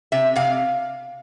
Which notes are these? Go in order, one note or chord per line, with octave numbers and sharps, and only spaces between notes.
C3 E5
C3 F5